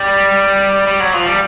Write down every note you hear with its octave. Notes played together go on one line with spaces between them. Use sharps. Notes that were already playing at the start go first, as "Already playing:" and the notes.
Already playing: G3
G3
F#3
F3
G3